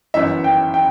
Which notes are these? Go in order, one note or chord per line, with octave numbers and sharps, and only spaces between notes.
G1 F#2 E3 E5
G5
G5